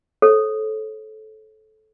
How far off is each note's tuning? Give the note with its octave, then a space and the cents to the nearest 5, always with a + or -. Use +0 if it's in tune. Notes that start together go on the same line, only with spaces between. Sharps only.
A4 -20 C#5 -40